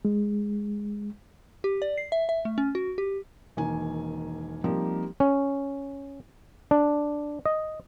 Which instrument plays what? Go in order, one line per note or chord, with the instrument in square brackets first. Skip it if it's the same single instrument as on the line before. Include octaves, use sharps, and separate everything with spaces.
[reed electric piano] G#3
[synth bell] G4
D5
C7
E5
E5
A3
C#4
F#4
G4
[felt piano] E1 D#3 A#3 G#5
F3 G3 A#3 C4 D#4
[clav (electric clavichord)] C#4
D4
D#5